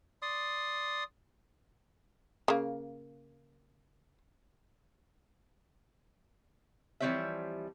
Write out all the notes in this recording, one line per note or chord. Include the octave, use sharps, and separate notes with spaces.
D5 C6 D#6
C#3 A#3
E3 F3 G3 C4 C#5 E5